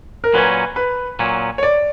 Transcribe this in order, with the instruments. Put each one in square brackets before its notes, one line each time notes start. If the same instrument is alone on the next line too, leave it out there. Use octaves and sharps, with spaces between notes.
[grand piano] A#4
[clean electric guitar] A#2 F#3 C#4 [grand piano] B4
[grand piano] B4
[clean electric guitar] A#2 F#3 C#4
[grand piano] C#5
D5